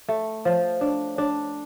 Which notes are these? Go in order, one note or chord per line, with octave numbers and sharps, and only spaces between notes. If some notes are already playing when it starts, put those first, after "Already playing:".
A3
F3
D4
D4